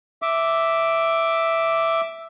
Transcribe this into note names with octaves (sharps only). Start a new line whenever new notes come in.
E5 D6